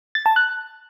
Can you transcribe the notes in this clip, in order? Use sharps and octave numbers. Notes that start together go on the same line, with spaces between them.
A6
A5
F#6